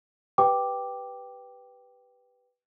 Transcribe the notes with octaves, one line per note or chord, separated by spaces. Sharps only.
G4 B4 G5 D6